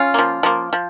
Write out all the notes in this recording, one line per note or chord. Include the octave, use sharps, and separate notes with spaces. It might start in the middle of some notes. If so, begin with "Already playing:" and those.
Already playing: C#4 F4
F3 A#3
F3 A#3
F3